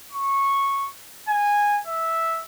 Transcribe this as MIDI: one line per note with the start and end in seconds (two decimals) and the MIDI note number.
0.13 0.90 85
1.29 1.81 80
1.87 2.45 76